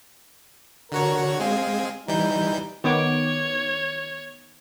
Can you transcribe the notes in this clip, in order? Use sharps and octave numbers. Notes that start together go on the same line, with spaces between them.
D3 F#4 A#4 C#5
G#3 C4 G#4 F5
E3 G3 D#4 G6
D#3 B3 C#5 D6